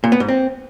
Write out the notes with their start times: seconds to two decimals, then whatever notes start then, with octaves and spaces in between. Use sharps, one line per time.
0.04 A#2
0.12 B3
0.20 G#2
0.28 C4